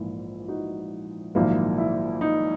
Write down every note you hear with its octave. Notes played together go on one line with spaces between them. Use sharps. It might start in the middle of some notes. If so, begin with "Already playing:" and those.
Already playing: A#1 G#2 E3 A#3 E4
D#4 F#4
A#1 G#2 D#3 F#3 A#3 E4
E4
D#4